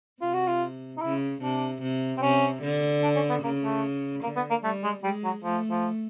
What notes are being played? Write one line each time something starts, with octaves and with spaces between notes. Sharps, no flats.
C3 F4
F#4
F4
D#4
C#3 E4
C3 D4
C3
C4
C3 C#4
D3
D4
C#4
B3
C#3 A#3
A3
D3 A#3
B3
A#3
G3 A3
G#3
G3 G#3
F#3
F3 A3
F3